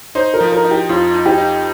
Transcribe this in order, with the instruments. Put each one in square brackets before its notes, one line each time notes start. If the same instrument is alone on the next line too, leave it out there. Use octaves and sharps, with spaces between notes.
[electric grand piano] D#4 [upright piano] C5
[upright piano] A#4
[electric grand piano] F3
[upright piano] A#4
[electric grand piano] D#4
[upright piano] G4
[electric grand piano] F2 [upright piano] F4
[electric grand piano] D#4
[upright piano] G4
[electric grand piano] D#4